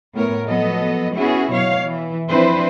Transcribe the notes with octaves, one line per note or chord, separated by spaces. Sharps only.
A2 B3 A#4 C#5
F3 F#3 B3 A4 D#5
B3 C#4 E4 F#4 G#4
B2 F#3 C#5 F5
E3
F3 C4 D4 E4 B4 C5